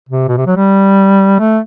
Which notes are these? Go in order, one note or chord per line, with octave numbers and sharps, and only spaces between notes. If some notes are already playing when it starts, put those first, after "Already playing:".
C3
B2
C3
F#3
G3
A3